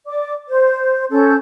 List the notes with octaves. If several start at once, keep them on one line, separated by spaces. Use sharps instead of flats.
D5 D6
C5
C#4 A4 G6